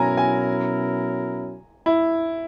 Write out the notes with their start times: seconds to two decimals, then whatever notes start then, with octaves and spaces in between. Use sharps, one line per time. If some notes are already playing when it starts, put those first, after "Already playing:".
Already playing: B2 F#3 C#4 E4 A#4 G#5 A#5
0.17 G#5
1.86 E4